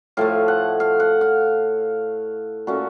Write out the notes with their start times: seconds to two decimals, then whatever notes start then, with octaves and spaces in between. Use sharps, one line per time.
0.17 A2 F3 A3 F5
0.48 F#5
0.80 F5
1.00 F#5
1.21 F5
2.67 A#2 A3 C#4 F#4